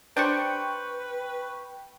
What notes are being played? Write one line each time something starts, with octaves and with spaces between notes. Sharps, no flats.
D4 G4 B4 C5 G5 C#6